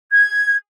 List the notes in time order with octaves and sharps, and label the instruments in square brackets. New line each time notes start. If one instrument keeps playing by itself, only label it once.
[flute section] G#6